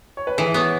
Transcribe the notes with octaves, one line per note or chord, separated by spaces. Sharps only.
C#5
B4
E3 G#4
B3 C#5